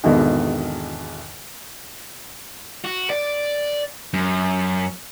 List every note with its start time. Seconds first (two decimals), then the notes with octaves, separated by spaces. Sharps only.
0.04 G#1 E2 B2 D3 D#3
2.85 F#4
3.10 D5
4.13 F#2